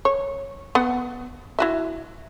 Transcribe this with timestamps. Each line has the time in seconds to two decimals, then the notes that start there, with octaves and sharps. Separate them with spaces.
0.05 C#5
0.75 B3 F#5
1.59 E4 F#4 E5